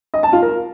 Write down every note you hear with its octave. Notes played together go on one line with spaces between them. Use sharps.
D#5
A5
F4
A#4